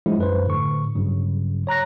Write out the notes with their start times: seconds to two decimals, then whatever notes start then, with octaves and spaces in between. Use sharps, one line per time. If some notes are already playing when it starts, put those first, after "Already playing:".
0.06 F3 F#3 G#3 D4 E4
0.18 F#2 B4 C5
0.46 A2 D3 C#6
0.95 G2 C#3 F#3
1.67 C#5 A#5 F#6 A#6